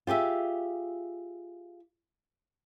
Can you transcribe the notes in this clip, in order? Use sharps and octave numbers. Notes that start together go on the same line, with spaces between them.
F4 G4 G#4 E5